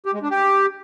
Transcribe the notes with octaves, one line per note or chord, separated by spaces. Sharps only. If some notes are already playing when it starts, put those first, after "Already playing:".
G4
G#3
D4
G4